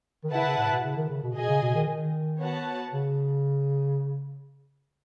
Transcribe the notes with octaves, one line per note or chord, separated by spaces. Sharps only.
D#3
C#3 E4 B4 F#5 A5
C#3
A2
B2
C#3
D#3
C#3
B2
B2 G#4 D#5 G#5
C#3
B2
D#3
D#3
B3 F#4 C#5 F#5 A5
C#3